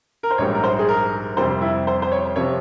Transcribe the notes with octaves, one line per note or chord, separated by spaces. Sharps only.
A#4
C5
A#1 G#2 G3 C#5
A#4
C5
G#4
A#4
F2 C3 G3 C5
E4
C5
C5
C#5
C3 F3 C#5